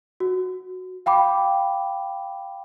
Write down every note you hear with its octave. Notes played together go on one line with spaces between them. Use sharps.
F#4
F5 G5 B5 D6